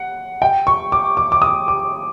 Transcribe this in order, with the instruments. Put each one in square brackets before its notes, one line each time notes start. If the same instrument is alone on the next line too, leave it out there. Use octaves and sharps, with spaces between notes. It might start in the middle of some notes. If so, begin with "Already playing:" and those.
Already playing: [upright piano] F#5
G5
C#6
D6
D6
D6
D#6
D6